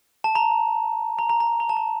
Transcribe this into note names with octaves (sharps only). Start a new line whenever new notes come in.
A5
A#5
A#5
A#5
A#5
A#5
A5
A#5